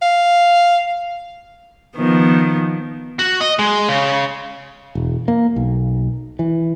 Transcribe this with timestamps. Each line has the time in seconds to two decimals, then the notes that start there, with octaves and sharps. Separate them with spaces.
0.02 F5
1.97 D#3 F3 B3
3.19 F#4
3.41 D#5
3.59 G#3
3.89 C#3
4.95 E1
5.28 A#3
5.56 B1
6.39 E3